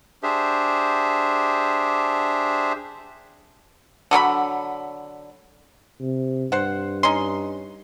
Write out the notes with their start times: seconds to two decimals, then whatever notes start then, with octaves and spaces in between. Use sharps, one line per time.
0.23 D4 G4 G#4 C5 E5
4.11 D3 F#3 A#4 B5
6.00 C3
6.52 G2 C5 F#5
7.03 C#4 D#4 C6